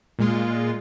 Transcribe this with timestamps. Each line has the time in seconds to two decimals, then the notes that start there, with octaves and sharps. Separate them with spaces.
0.19 A#2 G#3 F4